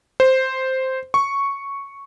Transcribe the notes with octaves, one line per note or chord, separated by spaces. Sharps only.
C5
C#6